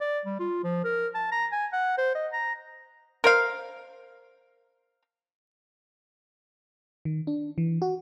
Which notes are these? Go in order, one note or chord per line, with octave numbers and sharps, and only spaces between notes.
D5
G3
F4
F3
A#4
A5
A#5
G#5
F#5
C5
D#5
A#5
A#4 C5 F5
D#3
D4
E3
F#4